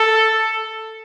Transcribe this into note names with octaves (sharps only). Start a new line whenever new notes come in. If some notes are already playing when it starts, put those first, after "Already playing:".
Already playing: A4